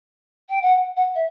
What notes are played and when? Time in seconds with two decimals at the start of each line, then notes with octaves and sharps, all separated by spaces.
0.49 G5
0.61 F#5
0.96 F#5
1.15 E5